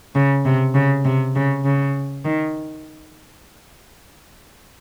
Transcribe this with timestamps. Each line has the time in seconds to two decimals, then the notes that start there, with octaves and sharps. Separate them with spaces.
0.14 C#3
0.45 C3
0.74 C#3
1.04 C3
1.34 C#3
1.64 C#3
2.24 D#3